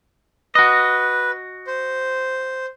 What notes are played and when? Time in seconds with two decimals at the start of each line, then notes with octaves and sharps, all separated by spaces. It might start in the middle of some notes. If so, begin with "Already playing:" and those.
0.55 F#4 B4 D#5
1.67 C5